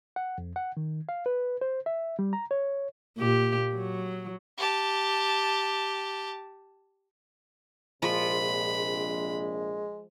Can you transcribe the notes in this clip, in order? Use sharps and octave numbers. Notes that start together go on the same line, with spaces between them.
F#5
F2
F#5
D#3
F5
B4
C5
E5
G3
A#5
C#5
A#2 G4
F#3
G4 A5
A#1 C3 F3 G#3 B5